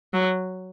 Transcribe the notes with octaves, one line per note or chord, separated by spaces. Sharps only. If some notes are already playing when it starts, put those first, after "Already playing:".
F#3